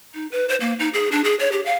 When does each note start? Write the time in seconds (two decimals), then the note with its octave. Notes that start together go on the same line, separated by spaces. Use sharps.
0.14 D#4
0.32 B4
0.49 C5
0.60 A#3
0.79 D#4
0.94 G#4
1.12 D4
1.24 G#4
1.40 C#5
1.52 G4
1.65 F5